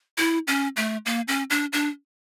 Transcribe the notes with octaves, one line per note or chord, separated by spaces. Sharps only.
E4
C#4
A3
A#3
C#4
D4
D4